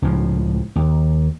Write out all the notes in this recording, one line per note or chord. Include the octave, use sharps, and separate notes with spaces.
C#2 A2 F3
D#2